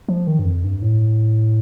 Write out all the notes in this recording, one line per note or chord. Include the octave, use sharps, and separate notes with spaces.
F3
D#3
G2
F2
G2
A2